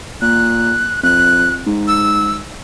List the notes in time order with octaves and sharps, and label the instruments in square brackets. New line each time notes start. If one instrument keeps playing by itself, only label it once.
[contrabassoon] A#2 [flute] F#6
[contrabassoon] F2 [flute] F#6
[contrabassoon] G#2
[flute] E6